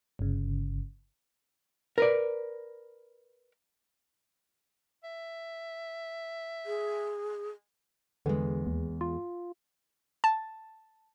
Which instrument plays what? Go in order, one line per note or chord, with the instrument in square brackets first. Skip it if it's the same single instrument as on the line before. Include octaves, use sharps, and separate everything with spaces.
[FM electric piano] G1 C#3
[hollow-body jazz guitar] A#4 B4 D5
[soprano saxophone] E5
[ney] G#4
[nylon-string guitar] E2 G#3 [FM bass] D3
[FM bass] D#2
F4
[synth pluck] A5